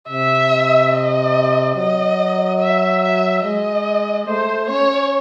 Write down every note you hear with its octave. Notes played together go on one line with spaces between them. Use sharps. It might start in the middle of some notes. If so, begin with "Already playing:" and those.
C3 E5
D#5
F#3 D#5
E5
E5
G#3 D#5
A3 C5
C#4 C#5